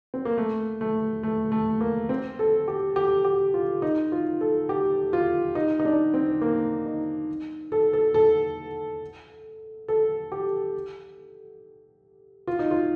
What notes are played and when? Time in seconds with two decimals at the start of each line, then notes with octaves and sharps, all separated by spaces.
0.14 C4
0.25 A#3
0.38 A3
0.81 A3
1.23 A3
1.52 A3
1.80 A#3
2.09 C4
2.39 A4
2.68 G4
2.96 G4
3.25 G4
3.54 F4
3.82 D#4
4.12 F4
4.41 A4
4.69 G4
5.13 F4
5.55 D#4
5.80 D#4
5.85 D4
6.14 C4
6.41 A#3
6.86 D#4
7.72 A4
7.93 A4
8.14 A4
9.88 A4
10.32 G4
12.47 F4
12.59 D#4
12.71 F4